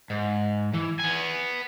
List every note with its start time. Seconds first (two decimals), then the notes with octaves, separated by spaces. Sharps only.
0.10 G#2
0.73 E3
0.99 B3 G#5